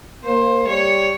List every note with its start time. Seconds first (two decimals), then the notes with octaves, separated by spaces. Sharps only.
0.24 A#3 C5
0.66 G3 C#5